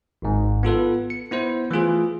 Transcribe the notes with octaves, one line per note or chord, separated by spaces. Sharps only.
G#1 G#2
B3 F4 A4 B4
C#7
B3 E4 C5
E3 A3 F4 G#4